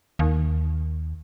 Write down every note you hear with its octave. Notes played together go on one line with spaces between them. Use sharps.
D#2